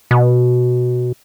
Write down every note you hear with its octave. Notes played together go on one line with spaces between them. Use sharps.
B2